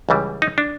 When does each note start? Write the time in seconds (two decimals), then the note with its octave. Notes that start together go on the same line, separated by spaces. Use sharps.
0.09 C#2 C#3 E3 G3
0.42 D#4
0.58 D4